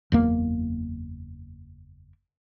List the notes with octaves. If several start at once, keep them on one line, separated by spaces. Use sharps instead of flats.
F#1 E2 A#3